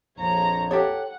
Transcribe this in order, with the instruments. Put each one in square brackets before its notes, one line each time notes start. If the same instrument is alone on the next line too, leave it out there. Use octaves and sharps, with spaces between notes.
[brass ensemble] A#1 F2 F3 [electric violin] C#5 A#5
[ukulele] G4 A4 C#5 [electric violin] F#5